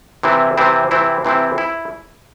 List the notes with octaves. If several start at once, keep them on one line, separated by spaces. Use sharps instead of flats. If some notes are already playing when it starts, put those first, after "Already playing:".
C3 E3 C4 E4
C3 E3 C4 E4
C3 E3 C4 E4
C3 E3 C4 E4
E4